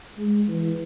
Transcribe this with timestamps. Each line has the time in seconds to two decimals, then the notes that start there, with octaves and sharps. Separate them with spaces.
0.17 G#3
0.48 E3